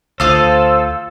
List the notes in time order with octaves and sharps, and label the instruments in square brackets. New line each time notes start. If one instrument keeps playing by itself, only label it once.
[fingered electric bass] D2 [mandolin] F4 F5 D#6 [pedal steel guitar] A4 [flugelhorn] C5